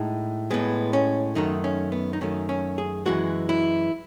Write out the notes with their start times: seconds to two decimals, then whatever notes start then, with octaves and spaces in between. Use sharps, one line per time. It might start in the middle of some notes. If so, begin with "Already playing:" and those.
Already playing: A2 G#3 D#4
0.51 A2 G#3 B3
0.93 C#4
1.35 F#2 D#3 A3 D#4
1.64 C#4
1.92 B3
2.13 D#4
2.21 F#2 D#3 A3 C#4
2.49 C#4
2.78 G#4
3.06 F#2 E3 G#3 F#4
3.49 E4